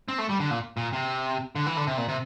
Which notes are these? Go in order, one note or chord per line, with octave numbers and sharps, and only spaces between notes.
C4
A3
G3
D3
A#2
A#2
C3
D3
E3
D3
C3
A#2
C3